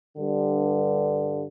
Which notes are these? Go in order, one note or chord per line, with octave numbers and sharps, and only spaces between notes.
G2 D3